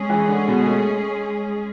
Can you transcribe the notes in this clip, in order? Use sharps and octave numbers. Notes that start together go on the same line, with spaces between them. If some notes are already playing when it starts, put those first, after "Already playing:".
Already playing: G#3 C#4 G#4
E3
D3
B2
A3